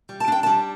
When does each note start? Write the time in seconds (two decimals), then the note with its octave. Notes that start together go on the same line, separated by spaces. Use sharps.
0.09 G3
0.20 A5
0.28 D4 G5
0.43 A5
0.46 G3